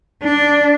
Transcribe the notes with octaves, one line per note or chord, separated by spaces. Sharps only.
D4